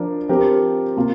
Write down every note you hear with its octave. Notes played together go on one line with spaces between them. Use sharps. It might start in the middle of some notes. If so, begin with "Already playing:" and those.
Already playing: F3 D4 A#4
F3 C4 G4 A#4
C3 A#3 F4 A#4